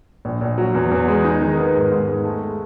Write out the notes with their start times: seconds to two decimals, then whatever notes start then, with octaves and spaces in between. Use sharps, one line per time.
0.25 A#1
0.41 A#1
0.58 F#3
0.75 E2
0.91 E2
1.08 G#3
1.25 D#4
1.41 D#3
1.57 B3
1.75 G#2
1.91 G#2
2.08 G#3
2.24 A3